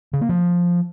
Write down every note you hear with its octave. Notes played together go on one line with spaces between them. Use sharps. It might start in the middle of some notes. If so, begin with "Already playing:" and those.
C#3
A#3
F3